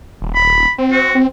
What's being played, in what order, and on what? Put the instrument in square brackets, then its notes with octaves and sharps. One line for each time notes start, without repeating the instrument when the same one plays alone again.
[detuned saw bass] D#1
[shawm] B5
[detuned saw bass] C4
[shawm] F#4
[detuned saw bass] C4